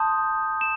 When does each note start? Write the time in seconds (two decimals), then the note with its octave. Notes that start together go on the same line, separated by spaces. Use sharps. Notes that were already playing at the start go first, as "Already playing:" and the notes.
Already playing: A5 C6 D#6 G6
0.61 E7